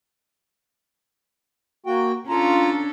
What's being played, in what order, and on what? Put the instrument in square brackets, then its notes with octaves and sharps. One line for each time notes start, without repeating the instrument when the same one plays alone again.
[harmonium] A#3 F#4 G5
[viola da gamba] C#4 D4 A4 [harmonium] F4 A#5